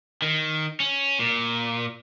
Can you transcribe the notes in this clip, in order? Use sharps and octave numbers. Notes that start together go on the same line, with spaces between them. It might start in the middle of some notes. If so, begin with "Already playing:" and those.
D#3
C#4
A#2